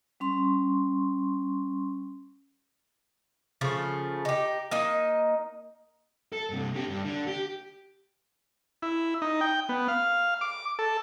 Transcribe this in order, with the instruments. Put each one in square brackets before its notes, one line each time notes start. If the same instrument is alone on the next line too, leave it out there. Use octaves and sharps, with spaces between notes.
[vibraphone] G3 C#4 C6 C#6
[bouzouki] C#3 F3 A3
D#4 G4
A#3 D#4 D#5
[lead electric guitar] A4
G2 C3
D3 G4
G2
D3
G4
[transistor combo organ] E4
D#4
G5
B3
F5
D6
A4